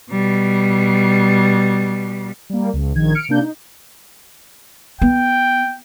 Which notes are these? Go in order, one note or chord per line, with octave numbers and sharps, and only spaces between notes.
B2 G3
G3 A#3
C#2
A#1 D#3 G#6
F6 C#7 D7
C3 A#3 D4 G6
D#4
B3 G5